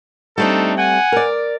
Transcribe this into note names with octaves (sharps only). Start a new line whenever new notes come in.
G3 A3 C4 D4 D#4 A4
F#5 G#5
A#4 D5